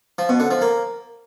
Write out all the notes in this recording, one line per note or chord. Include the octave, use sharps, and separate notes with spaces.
F3
B2
D3
F3
A#3